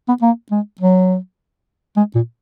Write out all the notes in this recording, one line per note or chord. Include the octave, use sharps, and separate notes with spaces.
B3
A#3
G#3
F#3
G#3
A#2